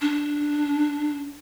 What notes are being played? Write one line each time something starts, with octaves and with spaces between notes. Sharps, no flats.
D4